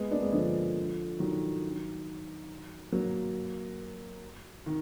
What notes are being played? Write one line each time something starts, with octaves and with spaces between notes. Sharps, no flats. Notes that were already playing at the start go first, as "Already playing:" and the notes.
Already playing: G#3 B3
A#3 D4
G#3 B3
D3 F3
D#3 F#3
F#3 A#3
D#3